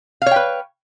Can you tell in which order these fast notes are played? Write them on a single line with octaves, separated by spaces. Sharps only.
F5 C#5 G5 B4